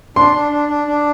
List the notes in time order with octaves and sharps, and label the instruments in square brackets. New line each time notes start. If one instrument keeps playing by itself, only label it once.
[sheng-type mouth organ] D4 [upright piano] C6
[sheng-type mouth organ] D4
D4
D4
D4